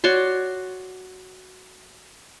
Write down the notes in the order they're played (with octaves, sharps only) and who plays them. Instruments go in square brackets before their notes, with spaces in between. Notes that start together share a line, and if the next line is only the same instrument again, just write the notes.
[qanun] F#4 C#5 D5 C6